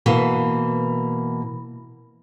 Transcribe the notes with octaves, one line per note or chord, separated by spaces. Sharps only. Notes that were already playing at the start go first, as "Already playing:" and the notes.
B2 E3 A#3